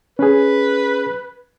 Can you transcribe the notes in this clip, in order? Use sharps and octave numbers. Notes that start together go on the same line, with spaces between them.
C#4 G#4 B4